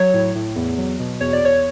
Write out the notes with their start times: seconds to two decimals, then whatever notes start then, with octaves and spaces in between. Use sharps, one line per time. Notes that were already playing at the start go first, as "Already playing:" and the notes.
Already playing: F#3 C#5
0.14 A2
0.35 A2
0.56 E2
0.78 F#3
0.99 B2
1.21 E2 C#5
1.33 D5
1.43 E2 C#5